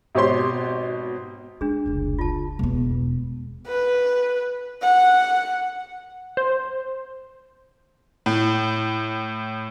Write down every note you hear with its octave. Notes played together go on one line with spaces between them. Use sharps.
G#1 B2 G4 C5 C#5 C6
G#3 D4 G#4
F1 C#2
F4 A5
E1 B3
B4
F#5
C5
A2